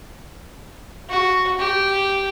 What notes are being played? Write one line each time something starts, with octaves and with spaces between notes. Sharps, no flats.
F#4
G4